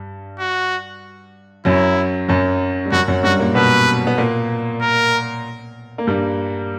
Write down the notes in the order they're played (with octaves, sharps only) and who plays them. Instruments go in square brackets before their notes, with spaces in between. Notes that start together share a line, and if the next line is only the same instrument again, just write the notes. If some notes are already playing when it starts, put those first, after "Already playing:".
Already playing: [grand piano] G2
[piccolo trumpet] F#4
[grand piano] F#2 F#3 [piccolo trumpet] E4
[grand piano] F#2 F#3
G3
[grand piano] F#2 F#3 [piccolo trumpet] F#4
[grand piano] F#2 F#3
[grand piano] G2 G3 [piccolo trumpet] F#4
[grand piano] A#2 A#3
[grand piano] B2 B3 [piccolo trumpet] B4
[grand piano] B3
A#2 A#3
[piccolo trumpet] A#4
[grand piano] A#3
G2 G3